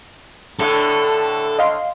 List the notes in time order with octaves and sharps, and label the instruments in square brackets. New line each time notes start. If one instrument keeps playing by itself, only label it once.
[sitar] A2 D3 [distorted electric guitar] A4
[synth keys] D#5 F5 C6